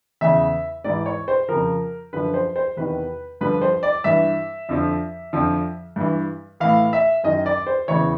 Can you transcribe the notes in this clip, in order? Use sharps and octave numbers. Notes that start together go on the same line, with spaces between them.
E2 C#3 E3 E5
G#2 E3 D5
C#5
C5
F2 C#3 F3 A#4
F#2 D3 F3 B4
C5
C5
E2 C3 D#3 B4
G2 D3 F3 B4
C5
D5
G2 E3 E5
F2 D3 F3
F2 D3 F3
G2 E3
A2 E3 F5
E5
F#2 D#3 D#5
D5
C5
E2 C#3 E3 C#5